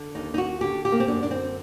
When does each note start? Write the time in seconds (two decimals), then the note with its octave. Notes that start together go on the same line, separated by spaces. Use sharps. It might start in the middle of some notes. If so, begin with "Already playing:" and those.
Already playing: D3
0.15 D#2 D#4
0.34 D#4
0.38 F#4
0.61 D3 G4
0.85 G4
0.92 A#3
1.00 C4
1.08 F#2 D4
1.23 D4
1.31 C4